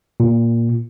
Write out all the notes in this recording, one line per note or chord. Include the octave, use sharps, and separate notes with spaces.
A#2